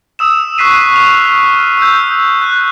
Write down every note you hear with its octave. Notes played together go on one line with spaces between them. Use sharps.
D#6 E6 E7
C#6 F#6 B6 C7 D#7
F6 F7
F6
E6 G6
F#6